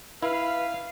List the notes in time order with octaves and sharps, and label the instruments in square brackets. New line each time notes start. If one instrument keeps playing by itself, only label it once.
[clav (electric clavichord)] E4 [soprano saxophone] B4 [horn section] F5